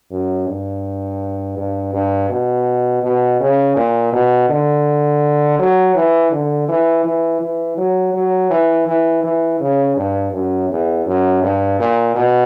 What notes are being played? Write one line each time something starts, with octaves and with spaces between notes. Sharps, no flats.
F#2
G2
G2
G2
B2
B2
C#3
A#2
B2
D3
F#3
E3
D3
E3
E3
E3
F#3
F#3
E3
E3
E3
C#3
G2
F#2
E2
F#2
G2
A#2
B2